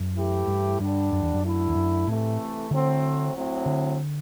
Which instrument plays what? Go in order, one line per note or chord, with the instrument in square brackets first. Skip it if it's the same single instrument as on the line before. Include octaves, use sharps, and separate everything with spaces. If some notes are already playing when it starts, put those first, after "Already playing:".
Already playing: [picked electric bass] F#2
[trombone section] E3 A3 E4 G4
[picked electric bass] G2
[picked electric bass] G2 [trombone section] D3 G3 D4
[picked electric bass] F#2
E2
F#2
[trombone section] D3 A3 E4
[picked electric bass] E2
F#2
[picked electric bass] A2 [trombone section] C3 E3 A3
[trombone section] A2 F#3 A3 C4 F#4 [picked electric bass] D3
[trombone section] A2 F#3 C4
[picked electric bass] D3